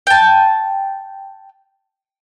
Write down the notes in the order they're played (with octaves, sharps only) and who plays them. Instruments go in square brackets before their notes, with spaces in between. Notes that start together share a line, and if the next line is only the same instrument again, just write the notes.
[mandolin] G5 A5